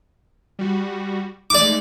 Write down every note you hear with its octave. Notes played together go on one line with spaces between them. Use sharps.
G3 F#4
G#3 A3 D#4 D5 D6